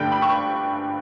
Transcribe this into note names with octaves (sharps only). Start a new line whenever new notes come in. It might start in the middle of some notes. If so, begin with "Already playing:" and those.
Already playing: G2 D3 A3 D4 G5
B5
C#6